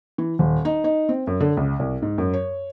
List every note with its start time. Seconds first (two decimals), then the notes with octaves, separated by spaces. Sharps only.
0.18 E3
0.39 D#1
0.65 D#4
0.84 D#4
1.09 C4
1.27 F#2
1.40 D3
1.57 C#2
1.79 C2
2.02 G#2
2.18 F#2
2.33 C#5